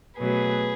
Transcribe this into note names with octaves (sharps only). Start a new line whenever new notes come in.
B2 F#3 A3 G#4 B4